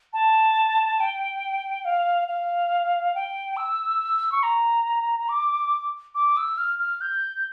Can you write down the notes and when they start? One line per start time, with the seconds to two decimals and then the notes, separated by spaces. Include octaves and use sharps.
0.13 A5
1.00 G5
1.85 F5
2.28 F5
3.15 G5
3.57 E6
4.32 C#6
4.43 A#5
5.29 D6
6.15 D6
6.37 E6
6.58 F6
6.79 F6
7.01 G6